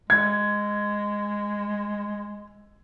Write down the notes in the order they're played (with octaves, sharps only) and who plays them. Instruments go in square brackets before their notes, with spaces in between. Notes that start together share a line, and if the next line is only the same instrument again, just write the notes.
[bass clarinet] G#3 [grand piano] G#6